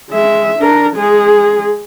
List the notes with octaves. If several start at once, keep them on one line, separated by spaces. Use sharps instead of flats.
G#3 E5
D4 A#4
G#3 G#4